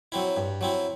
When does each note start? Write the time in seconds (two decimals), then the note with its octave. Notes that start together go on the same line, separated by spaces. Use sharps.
0.12 F#3 C4 E4
0.36 G2
0.61 F#3 C4 E4